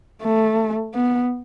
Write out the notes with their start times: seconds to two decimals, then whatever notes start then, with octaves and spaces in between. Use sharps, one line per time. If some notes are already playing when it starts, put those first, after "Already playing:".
0.23 A3
0.94 B3